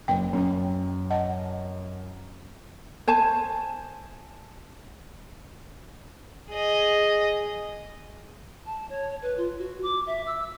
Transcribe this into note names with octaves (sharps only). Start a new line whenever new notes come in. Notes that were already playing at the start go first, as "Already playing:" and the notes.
F#1 F#2 G5
F#2 C#4
D#5 F#5 A5
C5 G#5 A5
G#4 D#5
A5
C#5
B4
F4
F#4
D6
E5
E6